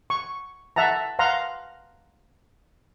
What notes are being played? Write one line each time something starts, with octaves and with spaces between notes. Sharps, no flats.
C#6
E5 F#5 A5 A#5
F5 F#5 A#5 C6